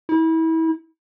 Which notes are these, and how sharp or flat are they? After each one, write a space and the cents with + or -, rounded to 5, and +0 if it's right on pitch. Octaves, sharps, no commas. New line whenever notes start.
E4 -30